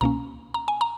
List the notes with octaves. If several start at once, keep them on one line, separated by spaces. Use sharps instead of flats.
C#2 B2 A#3 C#4 A#5
A#5
G#5
A#5